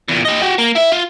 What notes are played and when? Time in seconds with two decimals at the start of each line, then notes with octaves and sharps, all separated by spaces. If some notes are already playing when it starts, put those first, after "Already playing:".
0.08 E2 A#2
0.25 G4 D#5
0.42 F#4 G4
0.58 A#3
0.75 E4 E5
0.92 F4